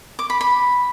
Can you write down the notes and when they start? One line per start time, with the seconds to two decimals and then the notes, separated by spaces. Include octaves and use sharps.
0.19 D6
0.30 B5
0.41 B5